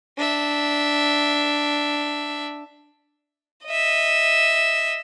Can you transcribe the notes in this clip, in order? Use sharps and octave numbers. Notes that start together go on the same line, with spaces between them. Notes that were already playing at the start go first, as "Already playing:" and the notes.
D4 E5
D#5 E5